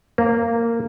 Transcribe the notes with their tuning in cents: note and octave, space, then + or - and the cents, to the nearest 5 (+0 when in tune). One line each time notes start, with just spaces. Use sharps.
A#3 -10